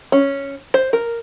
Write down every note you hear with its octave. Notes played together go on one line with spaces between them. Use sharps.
C#4
C5
A#4